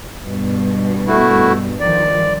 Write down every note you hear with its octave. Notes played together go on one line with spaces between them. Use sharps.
G2 B2
A3 E4 F#4
G1 D#3 F3 D5